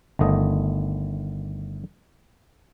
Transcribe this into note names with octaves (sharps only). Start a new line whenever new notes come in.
G1 D#3 A3 D#5